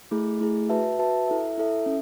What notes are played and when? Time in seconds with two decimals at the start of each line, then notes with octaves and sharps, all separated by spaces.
0.11 A3 E4 G#4
0.40 A3 E4 G#4
0.69 F#4 B4 E5 A5
0.99 F#4 B4 E5 A5
1.28 E4 A4 E5
1.58 E4 A4 E5
1.86 C#4